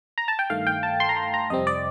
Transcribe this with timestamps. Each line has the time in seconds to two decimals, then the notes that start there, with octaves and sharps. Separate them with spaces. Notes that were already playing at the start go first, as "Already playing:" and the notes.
0.18 A#5
0.28 A5
0.39 G5
0.50 G2 D#3 A3 F5
0.67 G5
0.83 A5
1.00 C6
1.09 A#5
1.17 C6
1.34 A#5
1.50 F2 C3 G3 C4 D#5
1.67 D5